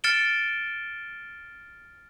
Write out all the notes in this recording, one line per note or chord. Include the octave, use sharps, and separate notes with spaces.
F6 A6 C#7 D7 E7 G7